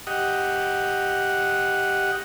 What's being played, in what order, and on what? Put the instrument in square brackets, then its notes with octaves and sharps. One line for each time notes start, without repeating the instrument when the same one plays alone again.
[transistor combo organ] G4 D#5 F#5